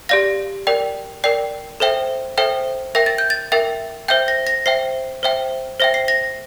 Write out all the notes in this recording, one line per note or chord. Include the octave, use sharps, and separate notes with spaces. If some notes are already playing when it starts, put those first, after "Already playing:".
G4 D5 F5 A#6
A#4 D5 G5
A#4 D5 G5 C7
A4 C5 E5 G5
A4 C5 E5 G5
A#4 E5 G5 A#6
A6
G6
A6
A#4 E5 G5 A6
C5 E5 G5 G6
A#6
A#6
C5 E5 G5 C7
C5 E5 G5
C5 E5 G5 A#6
C7
A#6